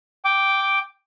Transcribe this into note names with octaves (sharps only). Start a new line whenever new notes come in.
G5 D6